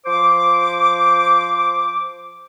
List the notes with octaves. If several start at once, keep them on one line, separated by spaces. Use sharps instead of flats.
F3 C5 D6